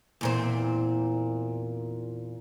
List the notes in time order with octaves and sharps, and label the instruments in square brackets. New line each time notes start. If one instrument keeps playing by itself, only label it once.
[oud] E2 A#2 C4